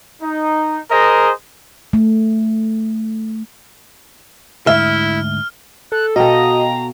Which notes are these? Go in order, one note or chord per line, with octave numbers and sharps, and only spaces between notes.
D#4
G#4 A#4 C5 D#5
A3
D2 G#2 E4 E5 F6
A4 F#6
B2 F#4 A4 D#5 F5 G5 A#5